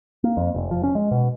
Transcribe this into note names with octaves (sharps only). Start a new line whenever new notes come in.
A#3
F2
F1
F3
C#4
G#3
B2